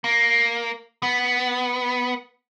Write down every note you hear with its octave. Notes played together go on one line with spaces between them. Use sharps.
A#3
B3